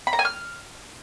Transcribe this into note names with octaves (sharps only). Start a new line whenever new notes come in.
B5
A#5
G#5
F6